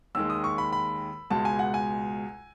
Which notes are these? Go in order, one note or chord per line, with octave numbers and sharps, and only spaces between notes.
D#2 D#3 G#3 E6
D#6
C#6
B5
B5
C#2 B2 G#3 A5
G#5
F#5
G#5